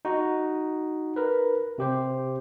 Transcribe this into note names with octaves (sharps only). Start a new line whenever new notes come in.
D#4 F#4
A#4 B4
C3 G4 C5